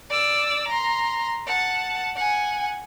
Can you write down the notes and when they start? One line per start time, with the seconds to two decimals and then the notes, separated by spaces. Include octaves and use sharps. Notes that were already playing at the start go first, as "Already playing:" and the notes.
0.10 D5 E6
0.68 A#5 C6
1.47 F#5 A5
2.16 F#5 G#5